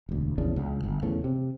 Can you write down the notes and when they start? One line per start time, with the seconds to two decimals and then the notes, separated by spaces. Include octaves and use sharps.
0.09 E1 D2
0.38 A#1 E2 C#3 D4
0.56 C#2
0.84 G1
1.03 D#1 E2 C#3 A3
1.24 C3